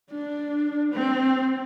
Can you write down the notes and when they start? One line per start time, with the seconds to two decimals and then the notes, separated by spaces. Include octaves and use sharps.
0.10 D4
0.92 C4